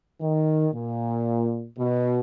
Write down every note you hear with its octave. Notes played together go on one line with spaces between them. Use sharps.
D#3
A#2
B2